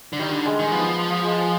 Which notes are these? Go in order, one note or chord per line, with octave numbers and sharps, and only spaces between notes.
D3
D#3 G3
D3
G#3
D#3
F3 B3
G#3